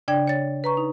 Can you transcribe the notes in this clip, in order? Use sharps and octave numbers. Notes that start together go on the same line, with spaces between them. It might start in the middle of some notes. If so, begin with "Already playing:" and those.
C#3 D4 D5 G5 G#6
C#5 A6
B4 A#5 C#6
D#4